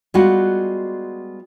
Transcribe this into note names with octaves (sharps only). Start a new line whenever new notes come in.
G3 G#3 B3 F4 F#4 F#5